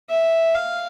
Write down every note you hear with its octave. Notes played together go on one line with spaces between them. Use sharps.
E5
F5